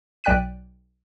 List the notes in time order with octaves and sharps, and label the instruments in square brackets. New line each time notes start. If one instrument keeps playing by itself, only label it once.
[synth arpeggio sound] B1 D5 G5 F#6 B6 D#7